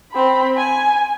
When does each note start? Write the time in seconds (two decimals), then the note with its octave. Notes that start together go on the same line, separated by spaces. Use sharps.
0.13 C4 B5
0.57 G#5